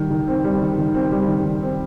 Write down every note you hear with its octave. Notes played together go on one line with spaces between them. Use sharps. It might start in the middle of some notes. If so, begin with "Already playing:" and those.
Already playing: D#3 G3
D#3
C4
G3
D#3
D#3
C4
G3
D#3
D#3
C4